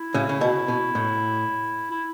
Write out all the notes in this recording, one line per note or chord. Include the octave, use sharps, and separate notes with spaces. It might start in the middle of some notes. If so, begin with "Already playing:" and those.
Already playing: E4
A2 C#3
C#3
B2
B2
A2
E4